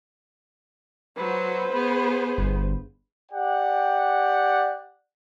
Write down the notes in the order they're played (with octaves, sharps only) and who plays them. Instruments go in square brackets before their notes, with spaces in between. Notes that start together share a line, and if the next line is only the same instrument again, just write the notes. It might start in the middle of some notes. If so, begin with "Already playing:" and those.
[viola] F#3 F#4 [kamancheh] B4 C5
[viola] B3 G#4
[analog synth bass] G1
[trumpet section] G4 D5 F#5 G5